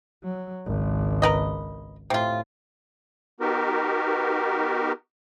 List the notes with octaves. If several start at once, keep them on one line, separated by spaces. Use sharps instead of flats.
F#3
G#1 C#2
A#4 B4 D#5
A2 C3 F4
B3 D#4 F#4 G4 A#4